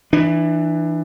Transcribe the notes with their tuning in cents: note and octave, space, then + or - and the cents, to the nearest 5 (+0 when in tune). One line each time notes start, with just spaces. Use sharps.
E3 +0 D4 +30